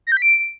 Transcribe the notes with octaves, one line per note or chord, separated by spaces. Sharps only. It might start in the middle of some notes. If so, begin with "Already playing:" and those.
A#6
G6
B6
D7